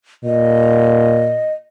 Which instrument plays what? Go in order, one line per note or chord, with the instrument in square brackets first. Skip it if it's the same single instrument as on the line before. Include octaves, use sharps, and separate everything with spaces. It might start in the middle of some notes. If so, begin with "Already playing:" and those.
[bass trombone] A#2 [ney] D#5